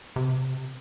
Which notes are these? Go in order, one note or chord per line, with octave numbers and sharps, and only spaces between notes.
C3